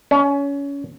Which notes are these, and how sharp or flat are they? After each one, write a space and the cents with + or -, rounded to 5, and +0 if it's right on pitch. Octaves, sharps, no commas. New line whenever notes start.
C#4 +25